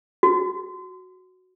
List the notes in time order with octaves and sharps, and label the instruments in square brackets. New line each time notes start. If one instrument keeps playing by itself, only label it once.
[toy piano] F#4